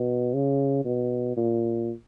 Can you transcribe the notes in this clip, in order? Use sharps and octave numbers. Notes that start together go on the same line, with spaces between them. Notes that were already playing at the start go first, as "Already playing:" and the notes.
Already playing: B2
C#3
B2
A#2